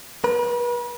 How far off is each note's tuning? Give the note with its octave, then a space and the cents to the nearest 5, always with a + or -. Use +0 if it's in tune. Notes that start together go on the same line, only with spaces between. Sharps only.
B4 -40